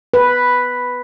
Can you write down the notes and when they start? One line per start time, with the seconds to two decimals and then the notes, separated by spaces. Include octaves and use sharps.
0.14 B4